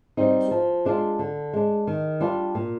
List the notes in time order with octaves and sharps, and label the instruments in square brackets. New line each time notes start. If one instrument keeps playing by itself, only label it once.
[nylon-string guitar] G3 C4 D#4
F3
G#3 D4 F4
D3
G#3 D4
D#3
G3 D4 F4
A#2